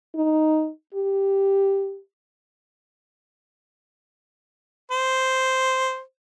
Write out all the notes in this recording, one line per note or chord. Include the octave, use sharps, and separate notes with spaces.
D#4
G4
C5